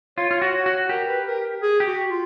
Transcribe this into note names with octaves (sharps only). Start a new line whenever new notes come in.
F4 C#5
F4
F#4
C#5
F#4
G4 A#4
B4
A#4
G#4
G4
F#4
F4